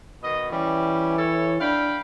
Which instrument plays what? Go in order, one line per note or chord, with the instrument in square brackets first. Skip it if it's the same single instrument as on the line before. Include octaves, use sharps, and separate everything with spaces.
[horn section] B2 D#3 D#5
[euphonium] E3 [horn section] G3 C#4
[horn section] A4 C#5
[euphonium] D4 [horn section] F5 G5 B5